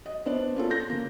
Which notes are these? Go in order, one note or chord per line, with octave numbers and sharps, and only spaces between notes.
D#5
B3 D4 C5 D5
A#3 C#4 F4 A4
G6 A#6
C#3 A#3